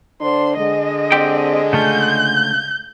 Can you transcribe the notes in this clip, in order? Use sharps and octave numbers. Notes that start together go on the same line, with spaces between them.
D3 D4 C5 C6
D3 G#3 D#5
C4 G4 G5
C#3 A3 F4 G6